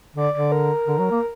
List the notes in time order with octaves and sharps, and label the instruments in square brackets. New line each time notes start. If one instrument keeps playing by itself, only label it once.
[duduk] D3 [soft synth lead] D5
[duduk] D3 [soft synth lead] D5
[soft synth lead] A#4
[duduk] D3
F#3
A#3